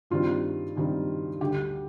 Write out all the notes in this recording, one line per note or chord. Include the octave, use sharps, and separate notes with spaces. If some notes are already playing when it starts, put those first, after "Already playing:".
G2 D#3 G3 C4 F4
G2 D#3 G3 C4
D2 D3 G3 G4